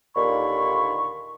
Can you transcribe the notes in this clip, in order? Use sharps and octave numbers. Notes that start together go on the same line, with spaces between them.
D#2 A#2 D3 D#3 B5 C#6